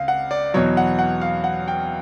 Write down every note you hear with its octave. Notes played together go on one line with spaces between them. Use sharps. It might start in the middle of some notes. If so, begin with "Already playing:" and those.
Already playing: C#2 F5
F#5
D5
E2 B2 F#3 C#5
F#5
F#5
F5
F#5
G5